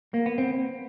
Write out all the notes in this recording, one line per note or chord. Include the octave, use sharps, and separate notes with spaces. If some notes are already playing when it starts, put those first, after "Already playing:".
A#3
B3
C4